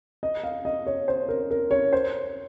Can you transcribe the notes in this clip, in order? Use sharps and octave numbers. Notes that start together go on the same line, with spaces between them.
D#5
F5
D#5
C#5
C5
A#4
A#4
C#5
C5